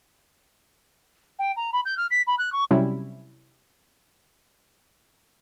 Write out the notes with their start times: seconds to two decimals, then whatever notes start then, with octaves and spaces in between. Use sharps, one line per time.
1.39 G5
1.56 A#5
1.73 B5
1.85 G6
1.97 F6
2.10 B6
2.27 B5
2.38 F#6
2.52 C#6
2.71 C3 F#3 G3 C#4 E4